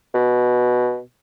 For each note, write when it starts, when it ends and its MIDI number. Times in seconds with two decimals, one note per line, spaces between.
0.14 1.00 47